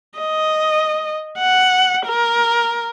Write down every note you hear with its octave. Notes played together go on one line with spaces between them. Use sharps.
D#5
F#5
A#4